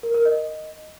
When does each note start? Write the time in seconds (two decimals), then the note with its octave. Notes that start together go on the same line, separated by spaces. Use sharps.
0.03 A#4
0.14 A#4
0.25 D#5